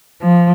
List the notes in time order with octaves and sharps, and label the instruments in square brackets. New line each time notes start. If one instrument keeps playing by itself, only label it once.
[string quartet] F3